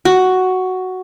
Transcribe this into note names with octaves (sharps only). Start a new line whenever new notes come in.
F#4